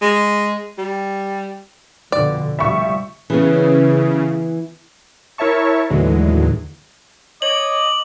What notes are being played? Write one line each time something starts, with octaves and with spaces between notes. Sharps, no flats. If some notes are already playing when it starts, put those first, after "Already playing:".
G#3
G3
F2 B2 D3 D5
F1 F3 G3 E5 C#6
C#3 E3 B3
E4 A#4 C#5 E5 A5 C#6
D#2 A2 D3 E3 F#3 G#3
C#5 D#5 D6 F#7